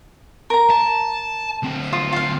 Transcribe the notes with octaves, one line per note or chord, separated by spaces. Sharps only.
A#4 A#5
A5
D2 C4
F4 D#6
F4 F5